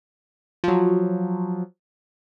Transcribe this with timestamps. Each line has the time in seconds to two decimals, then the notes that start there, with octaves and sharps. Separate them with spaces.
0.64 F3 F#3